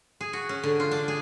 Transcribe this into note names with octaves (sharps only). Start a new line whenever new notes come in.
G#4
F#4
C#4
D3
F4
D4
G#4